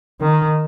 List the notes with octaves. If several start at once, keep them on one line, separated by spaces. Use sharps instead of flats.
D#3